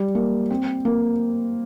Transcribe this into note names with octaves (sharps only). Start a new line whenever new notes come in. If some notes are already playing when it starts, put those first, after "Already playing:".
Already playing: G3
A#3
C4
A#3